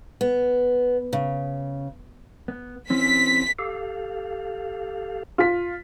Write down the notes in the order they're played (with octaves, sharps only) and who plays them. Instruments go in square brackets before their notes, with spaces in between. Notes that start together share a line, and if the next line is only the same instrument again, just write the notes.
[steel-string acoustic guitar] B3
C#3
[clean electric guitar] B3
[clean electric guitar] E3 C4 C#4 [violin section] B6
[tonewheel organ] G4 A4 F5
[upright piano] F4 B6